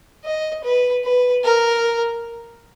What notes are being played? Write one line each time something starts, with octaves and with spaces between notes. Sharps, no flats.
D#5
B4
B4
A#4